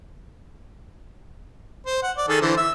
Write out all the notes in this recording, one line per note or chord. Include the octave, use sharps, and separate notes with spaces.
C5
F#5
D5
D#3 G#4 A4
D3 E3 C5
E5 E6